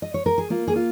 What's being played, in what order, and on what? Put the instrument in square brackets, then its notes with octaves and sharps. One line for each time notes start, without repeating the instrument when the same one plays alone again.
[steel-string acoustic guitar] D#5
C#5
A#4
G#4
A#3 F4
G#4
F4